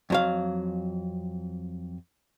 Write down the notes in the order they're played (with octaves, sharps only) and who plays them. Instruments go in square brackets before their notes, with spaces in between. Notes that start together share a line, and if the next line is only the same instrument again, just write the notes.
[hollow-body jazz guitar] F2 F#3 F5